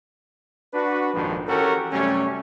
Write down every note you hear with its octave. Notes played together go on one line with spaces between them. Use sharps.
D4 F#4 B4
A#1 F2 G#2 D#3 F3
E3 C#4 F#4 G4 A4 A#4
F#2 C3 G3 A3 C#4